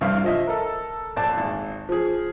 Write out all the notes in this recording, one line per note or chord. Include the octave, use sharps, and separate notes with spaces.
C2 G2 E4 F5 F6
F3 D#5 E5
A4 A#4
A#1 D5 A5
G#1
F3 G#4